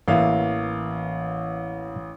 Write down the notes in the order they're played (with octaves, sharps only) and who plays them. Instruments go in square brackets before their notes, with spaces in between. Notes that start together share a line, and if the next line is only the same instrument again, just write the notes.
[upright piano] A1 F5 [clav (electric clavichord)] E3 A#3 E5